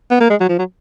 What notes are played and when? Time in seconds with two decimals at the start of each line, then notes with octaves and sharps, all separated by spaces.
0.10 B3
0.20 A#3
0.30 G#3
0.40 F#3
0.49 F3
0.59 F#3